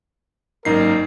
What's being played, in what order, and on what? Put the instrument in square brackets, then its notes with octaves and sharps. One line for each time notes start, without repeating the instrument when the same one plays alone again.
[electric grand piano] G#1 D#4 C7 [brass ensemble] F#2 A#3 A#4